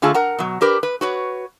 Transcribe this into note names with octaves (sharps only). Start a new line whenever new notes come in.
D3 A3 F4 G#4 A5
A#4 F#5 A#5
B2 F#3
D4 G4 A#4 B4
B4
F#4 B4 C#5